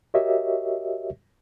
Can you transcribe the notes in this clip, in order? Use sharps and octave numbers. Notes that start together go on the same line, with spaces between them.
F#4 G4 A#4 C#5 D#5 E5